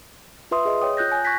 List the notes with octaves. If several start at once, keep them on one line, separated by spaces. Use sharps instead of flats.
F4 B4 E5 C6 D#6
G#4 D#5
C#5 G5 D#6
F4 F#6 G6 A#6
G#5
C#6 F#6 G#6 A#6 B6